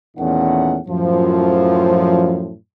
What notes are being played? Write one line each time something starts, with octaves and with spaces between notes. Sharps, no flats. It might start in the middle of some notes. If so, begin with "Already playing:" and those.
E2 A#2 D#3 A3 C#4 F#5
F#2 A2 F3